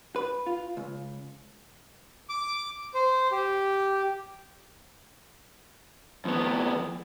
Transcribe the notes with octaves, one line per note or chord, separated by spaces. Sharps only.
B4
F4
C#2
D6
C5
G4
F2 B3